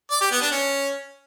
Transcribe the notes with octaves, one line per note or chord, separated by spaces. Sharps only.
D5
G4
B3
D4
C#4